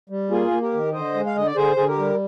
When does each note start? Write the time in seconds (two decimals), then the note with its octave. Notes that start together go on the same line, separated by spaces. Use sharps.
0.10 G3
0.30 A#3 F4 G#4
0.51 A#3
0.61 G4 A#4
0.73 D#3
0.93 D3 C5 D#5
1.14 G#3
1.26 F5
1.36 D3 D#5
1.46 D5
1.56 D3 G#4 C5
1.76 D3 G#4
1.88 G4 A#4
1.98 G3